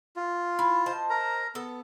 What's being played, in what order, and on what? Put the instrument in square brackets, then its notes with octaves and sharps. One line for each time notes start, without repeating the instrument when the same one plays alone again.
[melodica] F4
[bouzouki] E4
C5 D#5 A5
[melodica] A#4 A#5
[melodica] B3 [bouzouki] A4